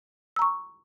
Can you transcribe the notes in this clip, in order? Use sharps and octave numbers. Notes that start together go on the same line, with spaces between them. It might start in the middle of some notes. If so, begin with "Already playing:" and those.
A#5 C#6 E6